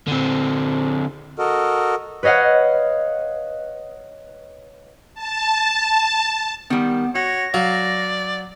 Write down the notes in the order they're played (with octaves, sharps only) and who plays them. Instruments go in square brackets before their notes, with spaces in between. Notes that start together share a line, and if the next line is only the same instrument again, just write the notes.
[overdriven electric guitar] D3 C4
[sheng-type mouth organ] F#4 A4 A#4 D#5
[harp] B4 C#5 D#5 F5 F#5
[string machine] A5
[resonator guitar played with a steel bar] D#3 G3 [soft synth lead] B3
[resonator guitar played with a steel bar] F#4 [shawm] C#5 [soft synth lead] A#6
[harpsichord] F#3 [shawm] D5 [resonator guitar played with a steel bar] F5